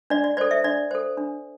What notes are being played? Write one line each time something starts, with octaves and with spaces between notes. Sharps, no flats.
D4 D5
D5
A4 C5 D5
E5
D4 D5
A4 C5
D4